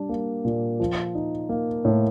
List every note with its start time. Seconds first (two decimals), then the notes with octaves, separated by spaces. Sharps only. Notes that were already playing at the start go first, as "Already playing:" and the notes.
Already playing: G3 D4
0.09 A#3
0.45 A#2
0.80 F3
1.15 D#4
1.49 A#3
1.85 A2